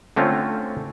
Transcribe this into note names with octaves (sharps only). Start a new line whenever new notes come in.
D3 A3 C4 C#4 F4